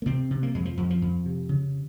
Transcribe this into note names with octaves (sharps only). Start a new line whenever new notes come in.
A#3
C3 C4
C3
A#3
F2 G#3
F3
F2
F3
F2
C3
C#3